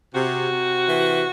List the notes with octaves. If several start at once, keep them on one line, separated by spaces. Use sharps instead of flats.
C3 F#4
C3
E3